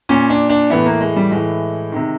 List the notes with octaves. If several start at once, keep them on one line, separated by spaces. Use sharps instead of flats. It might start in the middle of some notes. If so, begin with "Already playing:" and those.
A#2 C#4
D4
D4
A2 E3 B3
A#3
G#3
G3
A2 E3 G#3
C3 D#3